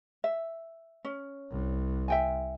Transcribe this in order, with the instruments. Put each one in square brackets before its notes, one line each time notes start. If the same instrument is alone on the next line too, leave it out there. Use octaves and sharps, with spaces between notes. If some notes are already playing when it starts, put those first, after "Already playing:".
[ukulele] E5
C#4
[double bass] C2
[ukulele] E5 G5 G#5